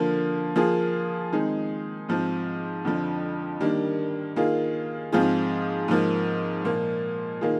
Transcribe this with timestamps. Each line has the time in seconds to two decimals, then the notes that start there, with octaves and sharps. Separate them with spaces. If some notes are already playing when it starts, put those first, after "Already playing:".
Already playing: D3 F3 A#3
0.56 F3 A#3 F4 G#4
1.32 D#3 G#3 C4 D#4 G#4
2.09 G#2 F3 C4
2.85 F2 D3 F3
3.60 D#3 G3 A#3 D4
4.36 D#3 A#3 F4 G#4
5.12 G#2 F3 C4 F4 G#4
5.88 G#2 F3 A#3
6.65 A#2 F3 A#3
7.41 D#3 A#3 F4 G#4